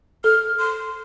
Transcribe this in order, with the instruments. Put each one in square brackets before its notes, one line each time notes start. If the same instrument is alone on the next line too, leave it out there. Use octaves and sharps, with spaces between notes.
[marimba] A4 [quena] F6
[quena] C6